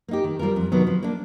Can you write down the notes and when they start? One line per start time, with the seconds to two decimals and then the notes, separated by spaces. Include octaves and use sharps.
0.08 A#3 D#4 G4
0.24 D#3
0.39 G3 C4 F4 A#4
0.56 F2
0.72 C3 D#3 F#3 B3
0.87 F3
1.03 A#3 D4